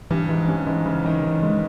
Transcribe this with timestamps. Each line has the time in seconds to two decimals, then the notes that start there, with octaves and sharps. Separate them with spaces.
0.11 G2 E3
0.29 G#2 E3
0.48 G2 C#4
0.67 G#2 E3
0.86 C#3 E3
1.04 D#3 E3
1.24 E3
1.43 G#3